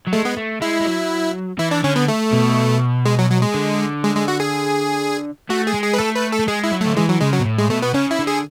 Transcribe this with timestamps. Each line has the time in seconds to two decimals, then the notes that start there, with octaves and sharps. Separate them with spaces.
0.07 F#3
0.12 G#3 A3
0.25 B3
0.37 A3
0.61 G#3 E4
0.81 G#3
0.86 F#3
1.59 E3 E4
1.71 D4
1.84 D3 C#4
1.96 B3
2.08 A3
2.33 B2
3.05 G#3
3.19 F#3
3.30 F#3
3.42 G#3
3.54 D3
4.03 G#3
4.16 G#3
4.28 F#4
4.40 G#4
5.50 A3 F#4
5.67 G#4
5.74 G#3
5.82 G#4
5.94 B4
5.98 A3 A4
6.15 B4
6.32 A4
6.39 A3
6.48 G#3 G#4
6.64 E4
6.72 F#3
6.81 A3
6.86 D3
6.97 E3 G#3
7.09 F#3
7.21 C#3 G#3
7.33 F#3
7.41 B2
7.46 A2
7.58 G#3
7.70 B2 A3
7.82 B3
7.94 C#3 C#4
8.11 E4
8.19 D3
8.27 G#4